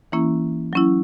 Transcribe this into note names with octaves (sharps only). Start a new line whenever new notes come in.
E3 A#3 C#4 E4
F#3 C#4 E4